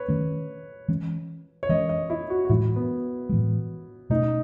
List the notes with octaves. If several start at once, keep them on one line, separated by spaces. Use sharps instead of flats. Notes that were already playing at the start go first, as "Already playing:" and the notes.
Already playing: B4 C#5
D#3 A3 C#4
E3 G#3 C#4
C#5
E3 G#3 C#4 D#5
D#5
E4
F#4
F#4
A2 E3 G#3 E4
B3
A2 E3 G#3
B2 A3 C#4 D#4